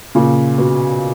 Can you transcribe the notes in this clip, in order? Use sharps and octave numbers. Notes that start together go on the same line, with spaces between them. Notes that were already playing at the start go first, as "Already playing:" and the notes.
A#2 C#3
B2